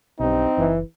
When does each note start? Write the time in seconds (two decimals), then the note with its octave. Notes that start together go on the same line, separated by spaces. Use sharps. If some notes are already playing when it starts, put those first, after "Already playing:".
0.20 B1 G2 C4 D#4
0.58 F#1 E3